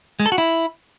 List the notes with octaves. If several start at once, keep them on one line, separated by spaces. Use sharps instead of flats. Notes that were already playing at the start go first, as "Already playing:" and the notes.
G#3
A4
F#4
E4